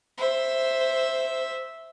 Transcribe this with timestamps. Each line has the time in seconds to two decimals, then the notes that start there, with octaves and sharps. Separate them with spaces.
0.18 C5 E5